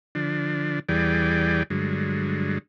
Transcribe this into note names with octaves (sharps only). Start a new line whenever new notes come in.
D3 F3 D4
E2 E3 G3 G#4 D5 G5
G2 D3 F#3 G#3